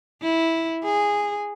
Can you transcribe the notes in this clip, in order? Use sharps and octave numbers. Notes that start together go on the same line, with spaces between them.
E4
G#4